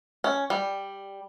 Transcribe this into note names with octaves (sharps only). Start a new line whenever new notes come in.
C#4
G3